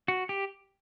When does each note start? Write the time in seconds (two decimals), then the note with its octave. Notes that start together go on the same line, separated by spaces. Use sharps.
0.08 F#4
0.29 G4